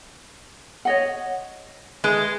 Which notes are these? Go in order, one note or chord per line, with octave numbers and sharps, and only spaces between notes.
C#5 D#5 F#5
G#3 B4